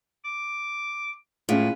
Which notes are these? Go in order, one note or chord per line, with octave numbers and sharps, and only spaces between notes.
D6
A2 G#3 C#4 F4 B4